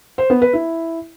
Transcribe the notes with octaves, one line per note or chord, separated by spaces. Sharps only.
C5
B3
B4
E4